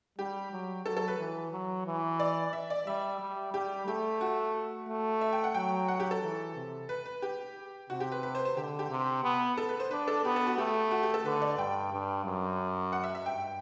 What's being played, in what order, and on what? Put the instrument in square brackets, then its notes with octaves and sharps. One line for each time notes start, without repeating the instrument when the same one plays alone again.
[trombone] G3 [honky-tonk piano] G4
[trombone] F#3
[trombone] F#3 [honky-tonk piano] A4
[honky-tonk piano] A4
B4
[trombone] E3
F#3
E3
[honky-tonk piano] D5
E5
D5
[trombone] G3 [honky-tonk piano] E5
[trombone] G3
[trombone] G3 [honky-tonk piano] G4
[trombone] A3 [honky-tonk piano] G4
[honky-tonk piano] F#4
[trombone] A3
[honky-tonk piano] E5
G5
F#5
[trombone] F#3 [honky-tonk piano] G5
[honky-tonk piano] F#5
G4
A4
[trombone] E3
C3
[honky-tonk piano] B4
B4
G4
[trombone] C3 [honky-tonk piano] F#4
[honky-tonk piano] G4
B4
B4
C5
C5
[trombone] D3 [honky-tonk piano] G4
[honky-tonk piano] G4
[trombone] C3
B3
[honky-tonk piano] A4
B4
C5
[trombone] D4 [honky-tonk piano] B4
[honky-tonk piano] A4
[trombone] B3 [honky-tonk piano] G4
[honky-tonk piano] A4
F#4
[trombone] A3 [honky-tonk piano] G4
[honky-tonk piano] F#4
G4
A4
[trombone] D3 [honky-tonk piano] B4
[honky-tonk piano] D5
[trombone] G2 [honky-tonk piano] G5
[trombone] G2
F#2
[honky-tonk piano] F#5
E5
E5
[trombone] G2 [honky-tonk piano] G5